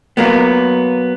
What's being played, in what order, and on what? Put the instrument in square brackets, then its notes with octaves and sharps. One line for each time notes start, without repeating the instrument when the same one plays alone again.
[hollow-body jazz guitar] F#3 A#3 B3